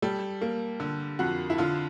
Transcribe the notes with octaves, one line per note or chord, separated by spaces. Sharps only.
G3 A4
A#3
D3
F2 F#4
E4
D3 F4